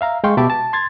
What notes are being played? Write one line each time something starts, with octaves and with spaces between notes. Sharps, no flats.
E5 F5 A#5
G#3 F5 G5 C6 C#6
B2 G4 E5 A5 B5 D6
A5
C6 G#6 A6